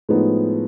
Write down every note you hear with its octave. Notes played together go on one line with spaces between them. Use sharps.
A2 F3 G#3 B3 D#4